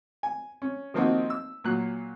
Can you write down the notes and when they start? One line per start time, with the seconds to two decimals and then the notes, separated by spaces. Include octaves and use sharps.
0.23 G#5
0.62 C#4
0.94 D#3 F3 A#3 C4 D#4 F#4
1.30 E6
1.64 A#2 F#3 F#6